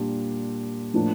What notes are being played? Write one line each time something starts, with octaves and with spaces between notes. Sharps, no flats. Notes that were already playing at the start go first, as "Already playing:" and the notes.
Already playing: A#2 G3 D4 F4
A2 F3 A#3 D4